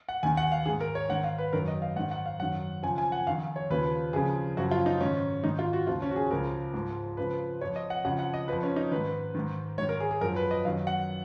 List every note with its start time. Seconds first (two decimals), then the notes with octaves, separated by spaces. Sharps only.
0.09 F#5
0.23 D#2 D#3 G#5
0.37 F#5
0.52 F5
0.65 G#2 D#3 G#4
0.81 A#4
0.95 C#5
1.09 G#2 D#3 F#5
1.24 F5
1.38 B4
1.53 F#2 D#3 A#4
1.68 D#5
1.82 F5
1.96 G#2 F#5
1.99 D#3
2.11 F#5
2.26 F5
2.40 F#2 D#3 F#5
2.83 F2 C#3 F3 G#5
2.98 G#5
3.12 F#5
3.27 F2 D#3 F5
3.56 C#5
3.70 D#2 C#3 F3 B4
4.13 F2 C#3 F3 G#4
4.57 F#2 C#3 F3 F#4
4.71 F4
4.86 D#4
5.01 G#2 D#3 C#4
5.44 G#2 D#3 D#4
5.59 F4
5.73 F#4
5.87 D#2 C#3 F3 F4
6.02 C#4
6.11 F#4
6.16 G#4
6.31 C#2 C#3 F3 A#4
6.74 G#2 F3
7.17 F2 C#3 F3 B4
7.61 F3 C#5
7.64 F2
7.76 D#5
7.90 F#5
8.05 F2 C#3 F3 F#5
8.19 F#5
8.34 D#5
8.48 F3 B4
8.53 F2
8.63 C#4
8.76 D#4
8.91 G#2 D#3 B4
9.35 G#2 D#3
9.78 G#2 D#3 C#5
9.89 A#4
10.00 G#4
10.11 G#4
10.21 F#2 A#4
10.24 F3
10.36 B4
10.51 D#5
10.65 F#2 D#3 F5
10.87 F#5